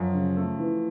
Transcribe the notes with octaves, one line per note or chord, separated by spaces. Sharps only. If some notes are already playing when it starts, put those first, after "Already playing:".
Already playing: F#2 F3
C#3
A3
E3